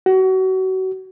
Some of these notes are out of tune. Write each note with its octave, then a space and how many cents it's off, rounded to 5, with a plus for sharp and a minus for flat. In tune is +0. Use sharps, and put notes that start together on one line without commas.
F#4 +30